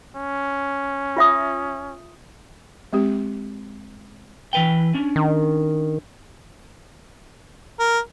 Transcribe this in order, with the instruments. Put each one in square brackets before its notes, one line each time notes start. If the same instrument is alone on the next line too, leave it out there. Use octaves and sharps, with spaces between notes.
[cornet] C#4
[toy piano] F4 E5 D#6
[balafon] G#3 C4 G4
[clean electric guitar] E3 B4 G5
C#4 D4
[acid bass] D#3
[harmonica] A#4